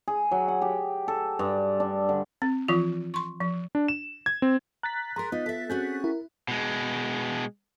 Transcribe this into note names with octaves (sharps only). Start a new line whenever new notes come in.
G#4
F#3
F#5
G4
A4
G2
D4
D3
C4
E3 F3 F4
C6 C#6
F3
D4
E7
G#6
C4
A#5 F#6 A6 B6
G#4 A#4 A#5 C6
B3 D#4 F4
A4 E5
C4 C#4 F#4 G#4 G6
E4 A#4
B2 G#3